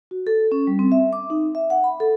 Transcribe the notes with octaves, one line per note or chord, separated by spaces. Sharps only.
F#4
A4
C#4
G3
C4
E5
D6
D#4
E5
F#5
B5
A4